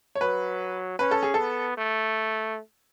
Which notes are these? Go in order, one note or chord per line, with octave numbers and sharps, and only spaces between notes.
C#5
F#3 B4
C#4 B4
A4
G#4
B3 A4
A3